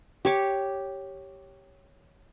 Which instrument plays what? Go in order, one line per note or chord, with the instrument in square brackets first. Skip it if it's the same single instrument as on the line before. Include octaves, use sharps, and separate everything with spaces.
[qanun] G4 C#5 D6